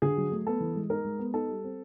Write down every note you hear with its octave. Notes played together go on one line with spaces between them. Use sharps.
D3 G#4
F#3
A3
B3 A4
E3
G#3
D#4 A#4
G#3
B3
D#4 A4
G3
C4